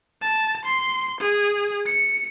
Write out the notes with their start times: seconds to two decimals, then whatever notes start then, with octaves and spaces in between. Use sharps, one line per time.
0.21 A5
0.65 C6
1.21 G#4
1.86 C#7